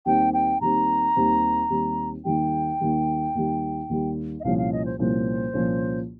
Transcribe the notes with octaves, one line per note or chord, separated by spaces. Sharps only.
D#2 D#3 G3 C4 G5
G5
D#2 D#3 G3 C4 A#5
D#2 D#3 G3 C4
D#2 D#3 G3 C4
D#2 D#3 G3 G5
D#2 D#3 G3
D#2 D#3 G3
D#2 D#3 G3
D#5
C2 A#2 F3 A#3 C#4 F5
F5
D#5
C5
C2 A#2 F3 A#3 C#4 C5
C2 A#2 F3 A#3 C#4